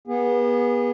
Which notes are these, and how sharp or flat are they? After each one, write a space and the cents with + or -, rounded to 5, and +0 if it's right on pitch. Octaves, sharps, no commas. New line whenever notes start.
B3 -30 G#4 -30